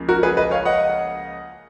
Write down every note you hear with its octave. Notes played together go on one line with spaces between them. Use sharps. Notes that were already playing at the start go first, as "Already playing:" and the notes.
Already playing: C#2 C#3 F3 A#3 C#4
F#4 A#4
G#4 B4
B4 D#5
C#5 F5
D#5 F#5